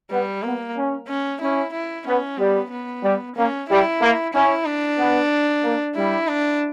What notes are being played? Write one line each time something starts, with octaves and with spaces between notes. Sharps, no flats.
G3 B3
A#3 B3
C#4
C#4
C#4 E4
E4
B3 C#4
G3 B3
B3
G3
A#3 C#4
G3 E4
A#3
C#4 E4
D4
B3
A#3
G3 E4
D4